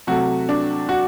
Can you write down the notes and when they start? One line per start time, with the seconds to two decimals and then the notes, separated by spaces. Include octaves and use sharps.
0.07 C3 F#3 A3 F#4
0.49 D4
0.89 F#4